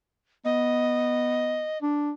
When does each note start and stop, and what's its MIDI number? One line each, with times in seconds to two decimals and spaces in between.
0.45 1.67 59
0.45 1.78 75
1.82 2.11 62